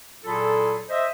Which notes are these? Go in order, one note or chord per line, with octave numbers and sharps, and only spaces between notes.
A#2 F#3 E4 F4 G#4 A4
C5 D#5 E5